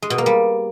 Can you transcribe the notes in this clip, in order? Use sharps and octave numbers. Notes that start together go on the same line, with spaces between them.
G#3
B2
A#3
G3